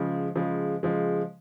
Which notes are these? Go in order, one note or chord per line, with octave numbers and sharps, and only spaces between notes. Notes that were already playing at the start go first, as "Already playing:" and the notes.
Already playing: C#3 F3 G#3
C#3 F3 G#3
C#3 F3 G#3